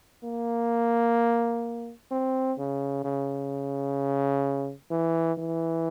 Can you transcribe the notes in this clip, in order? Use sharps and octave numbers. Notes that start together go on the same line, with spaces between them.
A#3
C4
C#3
C#3
E3
E3